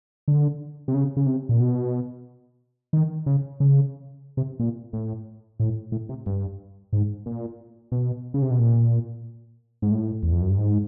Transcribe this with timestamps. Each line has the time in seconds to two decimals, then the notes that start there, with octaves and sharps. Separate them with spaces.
0.28 D3
0.88 C3
0.94 C#3
1.17 C#3
1.26 C3
1.49 A#2
1.60 B2
2.93 D#3
3.26 C#3
3.60 C#3
4.37 C3
4.60 A#2
4.93 A2
5.60 A2
5.92 A2
6.09 C3
6.26 G2
6.93 G#2
7.26 A#2
7.92 B2
8.34 C#3
8.42 C3
8.51 B2
8.59 A#2
9.82 G#2
9.92 A2
10.23 E2
10.32 F2
10.41 F#2
10.50 G2
10.58 G#2